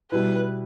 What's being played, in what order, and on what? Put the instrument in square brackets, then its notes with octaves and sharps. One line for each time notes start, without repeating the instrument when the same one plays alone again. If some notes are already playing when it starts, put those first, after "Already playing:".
[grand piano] B2 G3 E4 [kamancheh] B4